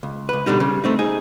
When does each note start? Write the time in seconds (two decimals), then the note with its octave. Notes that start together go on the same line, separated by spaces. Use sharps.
0.03 C#2
0.29 C#2 B4
0.46 B2 D3 G3 D#4
0.60 C#3 G3
0.84 A3 C4 D#4
0.99 D#4 G#4